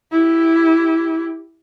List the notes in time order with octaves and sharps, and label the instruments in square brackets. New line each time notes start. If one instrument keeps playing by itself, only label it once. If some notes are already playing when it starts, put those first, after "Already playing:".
[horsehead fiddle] E4 G4